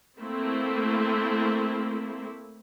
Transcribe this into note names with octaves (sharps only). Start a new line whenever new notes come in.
A3 A#3 C4 E4